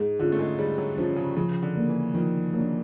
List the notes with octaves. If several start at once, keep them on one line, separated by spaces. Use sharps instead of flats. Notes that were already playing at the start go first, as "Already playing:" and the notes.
Already playing: G#2 G#3
D3 C#4 F4
A3
G#3
G3 G#3
F#3
F3 C#4 F4
C#3
C#3 F3
D3
A#3 D4
E3
D#3 F3
F#3 A#3 D4